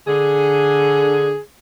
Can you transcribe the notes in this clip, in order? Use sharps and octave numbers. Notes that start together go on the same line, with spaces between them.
D3 G#4